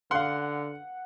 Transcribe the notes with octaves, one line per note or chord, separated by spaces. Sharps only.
D3 F5 F#5 C6